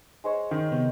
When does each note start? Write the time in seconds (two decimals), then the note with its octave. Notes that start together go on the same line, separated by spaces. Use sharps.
0.24 G#3 C5 C#5
0.51 D#3
0.72 C3 B3